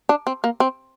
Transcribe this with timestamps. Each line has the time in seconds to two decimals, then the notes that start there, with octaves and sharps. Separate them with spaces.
0.09 D4
0.27 C4
0.44 A#3
0.60 C4